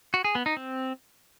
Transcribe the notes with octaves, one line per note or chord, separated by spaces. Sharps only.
F#4
G#4
B3
D#4
C4